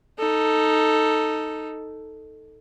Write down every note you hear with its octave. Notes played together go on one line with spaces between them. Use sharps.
D#4 A4